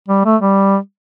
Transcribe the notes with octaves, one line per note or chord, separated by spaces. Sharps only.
G3
A3
G3